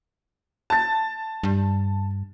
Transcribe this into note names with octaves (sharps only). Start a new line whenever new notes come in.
A5 A6
G2